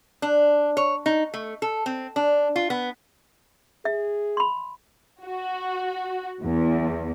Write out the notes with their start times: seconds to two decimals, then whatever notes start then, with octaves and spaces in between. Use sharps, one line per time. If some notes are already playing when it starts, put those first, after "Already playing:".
0.22 D4
0.77 C#5
1.06 D#4
1.34 A3
1.62 A4
1.86 C4
2.16 D4
2.56 F4
2.70 B3
3.85 G#4 E5
4.37 B5 C6
5.25 F#4
6.42 E2